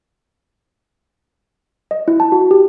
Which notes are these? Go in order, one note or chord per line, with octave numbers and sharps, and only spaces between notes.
D#5
E4
A5
F#4
G4